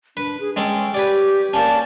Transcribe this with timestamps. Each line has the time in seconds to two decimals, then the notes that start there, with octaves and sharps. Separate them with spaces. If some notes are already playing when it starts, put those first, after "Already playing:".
0.17 D4 B4
0.40 G#4
0.56 G#3 C#4 A4 G5
0.94 G4 B4 C#5 D5
1.53 A#3 C#4 D5 A5